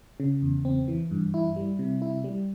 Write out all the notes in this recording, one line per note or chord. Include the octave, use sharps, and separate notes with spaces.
C#3
E2
C4
E3
G2
E4
G3
C3
E4
G3